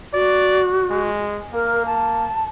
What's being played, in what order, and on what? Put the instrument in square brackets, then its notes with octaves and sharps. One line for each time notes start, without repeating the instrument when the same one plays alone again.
[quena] F#4 [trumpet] D5
[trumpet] G#3
[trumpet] A#3 [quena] A#4
[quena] A5